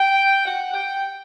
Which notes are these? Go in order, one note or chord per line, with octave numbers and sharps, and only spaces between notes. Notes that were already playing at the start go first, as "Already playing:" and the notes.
Already playing: G5
F#5
G5